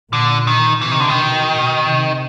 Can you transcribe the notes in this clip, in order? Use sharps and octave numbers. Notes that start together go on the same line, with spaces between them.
A#2 D3
D#3
C3 E3
D#3
D3
D#3
B2
B2
C3